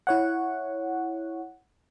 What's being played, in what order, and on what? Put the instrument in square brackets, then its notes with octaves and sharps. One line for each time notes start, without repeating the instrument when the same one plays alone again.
[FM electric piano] E4 C#5 F#5